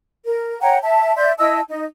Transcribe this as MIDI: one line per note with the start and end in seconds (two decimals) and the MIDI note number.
0.25 0.58 70
0.61 0.78 73
0.61 0.78 78
0.61 0.78 79
0.61 0.78 82
0.83 1.14 76
0.83 1.14 81
1.16 1.32 74
1.16 1.32 76
1.16 1.32 84
1.16 1.32 91
1.38 1.60 64
1.38 1.60 75
1.38 1.60 81
1.38 1.60 88
1.69 1.84 63
1.69 1.84 75